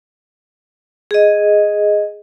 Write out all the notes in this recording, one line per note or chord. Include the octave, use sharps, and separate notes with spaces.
G#4 D#5